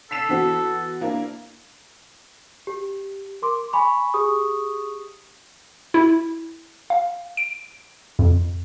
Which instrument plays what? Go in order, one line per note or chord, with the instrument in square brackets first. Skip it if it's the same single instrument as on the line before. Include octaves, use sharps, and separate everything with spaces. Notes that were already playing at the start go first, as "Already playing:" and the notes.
[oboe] A4 [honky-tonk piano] B6 C7 E7
[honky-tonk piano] E3 B3 F#4
A#3 D4 E4
[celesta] G4
A#4 C6 D6
G#5 B5 C#6
G4 G#4 C#6 D#6
[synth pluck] E4
F5
D7
F2